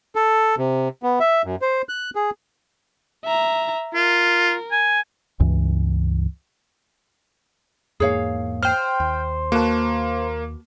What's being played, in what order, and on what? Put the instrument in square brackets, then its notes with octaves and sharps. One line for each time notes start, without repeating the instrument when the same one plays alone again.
[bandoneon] A4
C3
B3
E5
F#2
C5
F#6
G#4
[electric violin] E5 A#5
[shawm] F4 [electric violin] A#4
[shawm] G#5
[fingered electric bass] C#2 G2 E3
[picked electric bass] E2 G#2 A#3 [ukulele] G#4 C#5 F5
[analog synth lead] C5 [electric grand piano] G5 F6
[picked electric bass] D#2
[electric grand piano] A#3 [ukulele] F#4 B4 A5